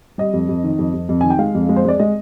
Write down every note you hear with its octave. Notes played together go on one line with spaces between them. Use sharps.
G3 D#5
F2
F2
D#3
F2
F2
F2
D#3 G#5
G5
G#3 F5
F2
G#3
C5
G#3 D5
G#3 D#5